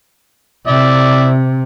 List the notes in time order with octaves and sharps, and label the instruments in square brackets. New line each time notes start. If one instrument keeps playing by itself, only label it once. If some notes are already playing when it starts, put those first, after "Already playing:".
[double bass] C3 [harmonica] E4 D5 E5